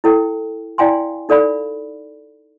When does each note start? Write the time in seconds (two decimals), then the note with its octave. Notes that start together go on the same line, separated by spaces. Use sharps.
0.04 E4 A4 G5
0.78 E4 D5 F5 G5 G#5 C6
1.29 D#4 A4 D5 F5 B5